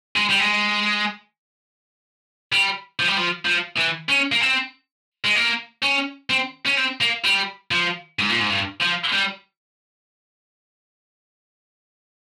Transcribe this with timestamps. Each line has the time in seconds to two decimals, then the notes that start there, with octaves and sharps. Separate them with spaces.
0.16 G#3
0.30 G3
0.39 G#3
2.52 G3
2.99 F3
3.08 G3
3.17 F3
3.46 F3
3.78 E3
4.09 C#4
4.32 A#3
4.41 C4
5.24 G#3
5.36 A#3
5.83 C#4
6.30 C4
6.66 C#4
6.77 C4
7.01 A#3
7.24 G3
7.71 F3
8.19 G#2
8.30 A#2
8.40 G#2
8.50 G2
8.82 F3
9.13 G3